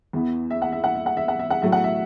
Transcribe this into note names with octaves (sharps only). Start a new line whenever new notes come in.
E2 E3 B3
E5
F#5
E5
F#5
E5
F#5
E5
F#5
E5
F#5
A2 F#3 A3 E5
F#5
E5